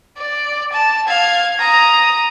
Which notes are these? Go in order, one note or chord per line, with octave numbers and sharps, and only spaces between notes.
D5
A5
F5 G#6
A#5 D#6